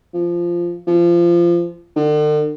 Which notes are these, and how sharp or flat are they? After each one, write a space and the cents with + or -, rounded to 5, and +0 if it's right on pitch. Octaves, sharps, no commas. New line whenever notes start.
F3 -10
F3 -20
D3 +45